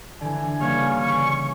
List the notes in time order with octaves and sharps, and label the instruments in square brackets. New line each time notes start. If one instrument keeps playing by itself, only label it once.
[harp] D3 E3 [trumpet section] G#5
[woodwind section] G2 G3 A#3 [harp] C#3 F6 G#6 [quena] C#6
[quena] C#6